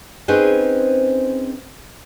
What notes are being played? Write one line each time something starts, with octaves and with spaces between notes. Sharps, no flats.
C4 C#4 D#4 G#4 B4 C5